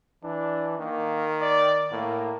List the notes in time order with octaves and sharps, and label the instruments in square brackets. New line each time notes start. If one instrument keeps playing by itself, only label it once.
[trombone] E3 [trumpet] D4
[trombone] D#3 [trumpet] A#3
[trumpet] D5
[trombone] A2 [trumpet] A#3